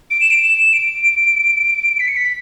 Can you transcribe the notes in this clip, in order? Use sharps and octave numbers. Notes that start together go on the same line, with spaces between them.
D7
E7
D7
E7
D7
B6
C#7
B6